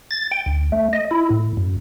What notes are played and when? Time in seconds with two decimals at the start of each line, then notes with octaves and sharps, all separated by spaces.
0.11 A6
0.31 G5
0.46 D2
0.72 A3
0.93 D#5
1.11 E4
1.30 A2
1.57 F#2